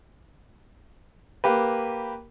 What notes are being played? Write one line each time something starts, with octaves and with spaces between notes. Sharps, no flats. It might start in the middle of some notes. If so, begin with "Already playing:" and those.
A#3 G4 B4